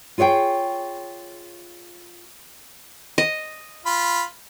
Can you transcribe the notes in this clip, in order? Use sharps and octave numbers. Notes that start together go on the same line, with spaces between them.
F4 G#4 C#5 E5 G5
D#5
F4 B5